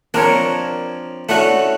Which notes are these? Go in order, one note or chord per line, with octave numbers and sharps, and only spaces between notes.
F3 A#3 C4 D4 A#4 C#5
A3 C#4 D4 E4 F#4